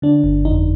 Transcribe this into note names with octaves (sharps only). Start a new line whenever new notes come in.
D3 D4
G1
F2 D#4